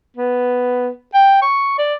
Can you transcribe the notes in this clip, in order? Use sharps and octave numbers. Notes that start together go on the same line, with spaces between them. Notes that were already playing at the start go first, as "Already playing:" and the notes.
B3
G5
C#6
D5